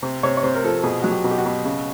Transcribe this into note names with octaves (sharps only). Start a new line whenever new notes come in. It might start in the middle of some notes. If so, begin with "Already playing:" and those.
C3
C3 C#5
C#5
C3 C5
A#4
F3 A4
B2 G#4
F#3 F#4
G4
B2
G4
F#4
B2
C#3